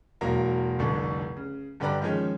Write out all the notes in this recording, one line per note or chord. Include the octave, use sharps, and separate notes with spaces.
E1 F#3 A#3 A#5
F1 C2 D3 A4
C#3
G2 D3 G4 B4 D5 A#5
D#3 F3 G#3 C#4